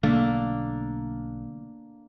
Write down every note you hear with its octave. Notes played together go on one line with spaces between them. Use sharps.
B1 D3 A3 A#3 D4 A4